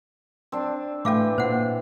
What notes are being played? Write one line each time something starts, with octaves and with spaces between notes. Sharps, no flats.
C4 D4
A2 E3 A4 F5 G5 D6
A#2 C5 F#5